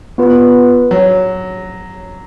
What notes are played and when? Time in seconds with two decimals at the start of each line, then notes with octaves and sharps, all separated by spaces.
0.18 B3 F4 B4
0.91 F#3